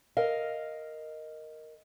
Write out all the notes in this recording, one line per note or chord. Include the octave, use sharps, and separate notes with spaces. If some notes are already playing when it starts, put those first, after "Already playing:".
A#4 D#5 F5